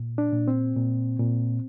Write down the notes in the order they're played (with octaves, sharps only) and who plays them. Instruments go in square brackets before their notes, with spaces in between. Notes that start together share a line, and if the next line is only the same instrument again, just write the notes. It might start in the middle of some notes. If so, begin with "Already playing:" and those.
Already playing: [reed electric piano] A#2
D4
A#2
C4
A#2
A#2